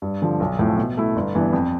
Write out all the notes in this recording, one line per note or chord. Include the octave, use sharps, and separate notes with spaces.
G2
D3 F3
B1
A2 F3 A3
B2
A3 E4
G1
G2 E3 B3
F2